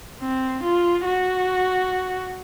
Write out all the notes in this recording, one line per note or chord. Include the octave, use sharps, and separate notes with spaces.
C4
F4
F#4